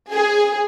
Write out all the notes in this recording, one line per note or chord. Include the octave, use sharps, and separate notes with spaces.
G#4